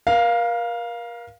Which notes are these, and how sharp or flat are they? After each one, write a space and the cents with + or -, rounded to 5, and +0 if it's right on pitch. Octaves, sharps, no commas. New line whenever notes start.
A#4 +35 F5 +0